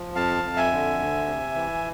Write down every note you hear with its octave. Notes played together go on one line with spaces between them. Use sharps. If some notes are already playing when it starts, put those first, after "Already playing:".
Already playing: F3
F2 F5 A5
F2
E5 G#5
D3
D2
C3
E3